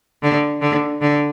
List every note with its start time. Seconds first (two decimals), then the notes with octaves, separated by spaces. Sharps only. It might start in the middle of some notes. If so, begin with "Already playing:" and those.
0.22 D3
0.61 D3
1.01 D3